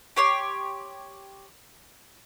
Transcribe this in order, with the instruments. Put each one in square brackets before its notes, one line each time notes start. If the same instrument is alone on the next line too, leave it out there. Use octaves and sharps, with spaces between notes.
[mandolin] G4 C#5 C6